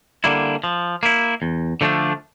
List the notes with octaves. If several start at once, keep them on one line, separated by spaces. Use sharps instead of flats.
D3 G3 A#3 E4
F3
A#3 E4
E2
D3 F3 A3 D4